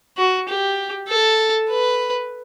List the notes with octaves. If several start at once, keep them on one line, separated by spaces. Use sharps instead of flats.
F#4
G4
A4
B4